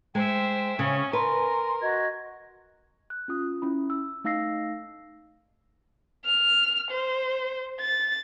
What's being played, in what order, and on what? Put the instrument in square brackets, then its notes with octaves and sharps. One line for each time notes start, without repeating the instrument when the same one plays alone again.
[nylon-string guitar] G#3 [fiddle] C5 E5 [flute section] G5
[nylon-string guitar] C#3 [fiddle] C#4
[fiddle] A#4 [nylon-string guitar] B4 [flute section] G#5 C6
[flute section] F#4 D#5 G#6
[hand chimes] F#6
C#4 F4 D#6
C#4 E4 B5
E6
A3 D#4 F5 E6 A#6 C7
[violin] F6
C5
A6